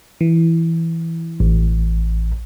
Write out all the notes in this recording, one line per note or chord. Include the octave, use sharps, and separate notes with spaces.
E3
A1